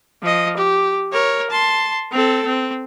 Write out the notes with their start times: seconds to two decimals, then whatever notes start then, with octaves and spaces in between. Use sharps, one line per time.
0.22 F3 D#5
0.57 G4
1.12 A#4 C#5
1.51 A5 C6
2.11 C4 A4
2.45 C4